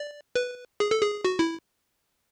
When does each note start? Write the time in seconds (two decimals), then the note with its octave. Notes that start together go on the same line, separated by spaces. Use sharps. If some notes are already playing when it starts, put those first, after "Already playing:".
Already playing: D5
0.35 B4
0.80 G#4
0.91 A4
1.02 G#4
1.25 F#4
1.39 E4